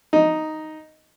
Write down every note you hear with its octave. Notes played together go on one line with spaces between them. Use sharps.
D#4